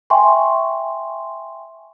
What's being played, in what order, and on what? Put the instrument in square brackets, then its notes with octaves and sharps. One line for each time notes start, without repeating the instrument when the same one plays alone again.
[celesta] E5 G5 G#5 C6 C#6